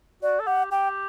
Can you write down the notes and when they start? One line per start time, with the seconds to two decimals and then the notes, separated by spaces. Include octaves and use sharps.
0.23 F#4 D5
0.40 A4
0.46 G4 F#5
0.71 G4 G5